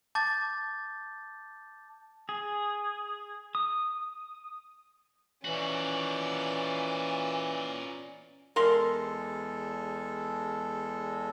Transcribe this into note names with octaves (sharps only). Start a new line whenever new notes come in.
A5 D6 G6 A6
G#4
D#6
A#2 E3 C#4 F#4 D5
E2 G#3 A4 A#4 F5 C6